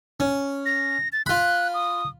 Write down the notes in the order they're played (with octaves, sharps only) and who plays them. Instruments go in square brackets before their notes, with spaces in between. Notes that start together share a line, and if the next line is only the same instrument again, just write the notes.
[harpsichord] C#4
[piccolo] A#6
A6
[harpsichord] F4 B5 [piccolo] F#6
[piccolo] D#6